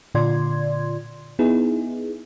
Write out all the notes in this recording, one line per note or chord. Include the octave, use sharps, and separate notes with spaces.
A#2 D3 F4 D5 C6 G#6
B3 D#4 E4 G#4